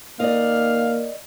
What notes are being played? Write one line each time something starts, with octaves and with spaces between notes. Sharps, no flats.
D#3 A#3 D5 D#5 F5